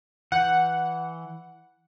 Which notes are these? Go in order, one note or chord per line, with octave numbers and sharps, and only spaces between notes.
E3 F#5 G6